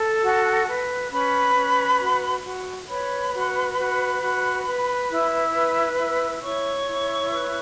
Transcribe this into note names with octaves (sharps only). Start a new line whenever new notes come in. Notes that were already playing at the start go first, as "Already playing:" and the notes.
Already playing: A4 A5
F#4
B4
C#4 B4 B5
C#4
F#4
F#4
B4 C#5 B5
F#4
F#4
F#4
B4
E4
B4
E4
E4 C#5 C#6
E4
B4